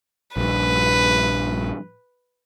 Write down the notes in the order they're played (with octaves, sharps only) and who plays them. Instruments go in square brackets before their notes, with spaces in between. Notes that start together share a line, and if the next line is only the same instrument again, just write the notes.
[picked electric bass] A#1 G2 [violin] B4